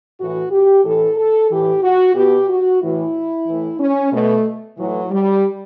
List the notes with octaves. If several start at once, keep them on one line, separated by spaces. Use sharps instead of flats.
A2 E3 F#4
G4
A2 E3 A4
A4
A2 E3 G4
F#4
B2 G4
F#4
A2 E3 E4
A2 E3
C#4
B2 A3
A2 E3 F#3
G3